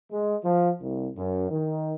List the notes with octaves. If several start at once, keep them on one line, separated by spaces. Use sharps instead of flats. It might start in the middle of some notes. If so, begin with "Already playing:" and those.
G#3
F3
C2
F#2
D#3